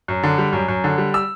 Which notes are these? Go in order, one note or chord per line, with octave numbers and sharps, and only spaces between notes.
F#2
D3
G3
F#2
F#2
D3
G3
E6